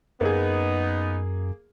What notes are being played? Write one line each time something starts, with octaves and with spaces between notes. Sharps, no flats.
F#2 A#3 B3 D#4 G#4